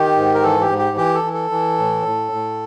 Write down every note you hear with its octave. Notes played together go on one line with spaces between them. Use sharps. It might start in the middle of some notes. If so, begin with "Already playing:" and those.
Already playing: D#3 G4
G#2
A#4
E3 A4
G4
G#2
G4
E3 G4
A4
E3
A4
E3
A2
A2
A2